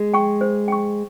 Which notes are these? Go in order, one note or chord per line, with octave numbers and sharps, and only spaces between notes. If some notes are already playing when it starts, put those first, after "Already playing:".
Already playing: G#3
G5 C#6
C5
G5 C#6